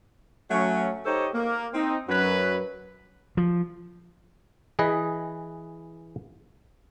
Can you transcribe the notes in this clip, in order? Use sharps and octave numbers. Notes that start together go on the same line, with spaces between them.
F#3 A3 C#4
D#4 G4 A4 C5 C#5 D#5
A#3
C4 D#4
F#2 F#3 B4
F3
E3 G#4 B4 D#5